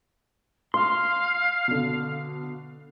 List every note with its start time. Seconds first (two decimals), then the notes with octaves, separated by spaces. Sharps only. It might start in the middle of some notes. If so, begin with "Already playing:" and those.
0.74 F5 C6
1.68 B2 D3